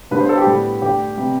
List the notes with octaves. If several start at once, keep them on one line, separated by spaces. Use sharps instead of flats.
G2 D3 G3 B3 B4
C5
A4
G4
A2 G3 B3
G2 D3 A3 G4
C3 G3 B3